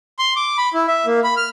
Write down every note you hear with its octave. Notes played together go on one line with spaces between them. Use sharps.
C6
D6
B5
E4
E5
A#3
B5
F6